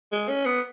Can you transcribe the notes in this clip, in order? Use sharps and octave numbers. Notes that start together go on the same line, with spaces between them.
G#3
C#4
B3